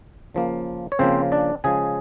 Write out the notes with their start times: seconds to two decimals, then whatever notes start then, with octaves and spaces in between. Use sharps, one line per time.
0.34 C#3 F3 A#3
0.92 C#5
0.99 C#3 F3 A#3 C4 C5
1.32 D4 D5
1.64 C#3 F3 G#3 G#4 G#5